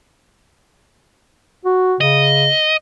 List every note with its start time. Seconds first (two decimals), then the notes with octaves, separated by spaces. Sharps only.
1.65 F#4
2.01 C#3 D#5